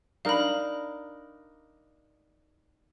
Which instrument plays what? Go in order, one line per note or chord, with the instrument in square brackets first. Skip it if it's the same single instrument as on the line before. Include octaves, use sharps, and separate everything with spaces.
[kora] D4 D#4 A#4 [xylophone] F5 B5